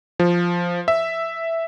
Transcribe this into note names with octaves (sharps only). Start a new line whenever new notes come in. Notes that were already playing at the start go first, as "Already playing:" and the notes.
F3
E5